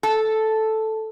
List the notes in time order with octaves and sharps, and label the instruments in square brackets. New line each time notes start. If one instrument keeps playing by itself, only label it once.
[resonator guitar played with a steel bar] A4